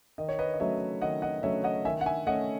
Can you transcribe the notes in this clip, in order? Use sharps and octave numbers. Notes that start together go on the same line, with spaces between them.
D#3 D#5
C#5
B4 D#5
D#5
F#3 A3 C#4 C#5 E5
D#3 D#5 F#5
D#5 F#5
F#3 A3 C#4 C#5 E5
D#5 F#5
D#3 E5 G#5
F#5
E5 G#5
A3 C#4 D#5 F#5